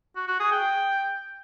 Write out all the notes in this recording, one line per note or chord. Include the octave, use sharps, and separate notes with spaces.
F#4
F#4
G#4
G5